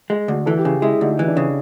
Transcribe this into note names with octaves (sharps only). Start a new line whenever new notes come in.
G#3
D2
E3 A4
G4
C#3 G#4
G#3 E4
D2 D#4
E3
D4
C#3